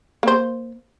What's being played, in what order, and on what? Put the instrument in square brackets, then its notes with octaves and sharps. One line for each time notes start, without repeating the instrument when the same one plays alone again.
[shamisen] A#3 C5